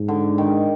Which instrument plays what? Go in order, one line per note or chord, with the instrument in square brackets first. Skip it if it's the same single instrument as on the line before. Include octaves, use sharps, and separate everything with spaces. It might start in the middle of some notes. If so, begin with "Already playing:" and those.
Already playing: [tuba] G#2
[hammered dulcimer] D3
D#3